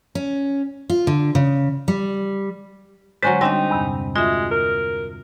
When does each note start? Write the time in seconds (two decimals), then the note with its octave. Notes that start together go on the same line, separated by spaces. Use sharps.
0.15 C#4
0.90 F4
1.07 D3
1.35 C#3
1.88 G3
3.23 D3 F#3 G#3 C#4 C5 D5
3.41 G3 C4 D4 D#4 G5
3.70 E2 G2 C3
4.16 G#3 F4 F#4 E5
4.51 A#4